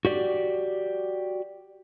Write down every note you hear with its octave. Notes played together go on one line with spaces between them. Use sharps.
F#4 G4 D5